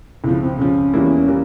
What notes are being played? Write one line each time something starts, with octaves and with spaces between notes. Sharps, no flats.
C#2 C3 F3 E4
C4
C#2 C3 F3 C#4
E2 E3 G3 A#3 E4
E3 G3 A#3